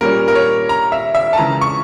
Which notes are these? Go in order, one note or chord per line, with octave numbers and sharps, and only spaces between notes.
A#2 G3 C#4 A#4
A#4
C#5
A#5
E5
E5
A5
C#2 C#3 E3 A#5
C#6